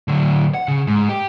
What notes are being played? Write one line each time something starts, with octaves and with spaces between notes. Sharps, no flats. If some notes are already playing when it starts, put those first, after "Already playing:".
D3 F#3
F#5
C#3
G#2
G4